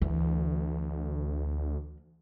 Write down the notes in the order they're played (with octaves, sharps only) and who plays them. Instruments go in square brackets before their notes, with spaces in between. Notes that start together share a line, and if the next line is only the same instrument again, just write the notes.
[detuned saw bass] D2 [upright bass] E3